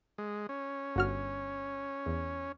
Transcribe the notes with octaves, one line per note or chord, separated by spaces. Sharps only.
G#3
C#4
G1 F#4 F6
E2